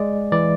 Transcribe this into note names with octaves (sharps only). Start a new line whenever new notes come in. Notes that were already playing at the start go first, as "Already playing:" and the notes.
Already playing: G#3 D5
E3 D5